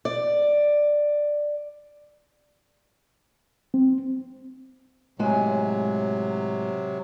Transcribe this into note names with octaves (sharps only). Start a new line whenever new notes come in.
D5
C4
A2 C3 F#3 G#3 G#5